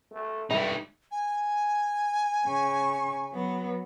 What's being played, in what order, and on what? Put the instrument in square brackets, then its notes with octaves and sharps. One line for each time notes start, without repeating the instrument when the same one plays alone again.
[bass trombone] A3
[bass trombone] G2 [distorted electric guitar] A3 D#4 [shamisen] E4
[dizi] G#5
[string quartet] C#3 C#6
F#3 B3